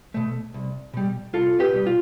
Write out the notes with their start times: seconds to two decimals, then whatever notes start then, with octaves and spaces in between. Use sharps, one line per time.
0.14 B2 A3
0.54 C2
0.93 B2 G3
1.33 C2 F4 A4
1.60 G4 B4
1.73 B2 G3
1.86 F4